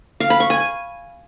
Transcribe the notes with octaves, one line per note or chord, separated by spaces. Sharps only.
F5
B5
C#6
G#5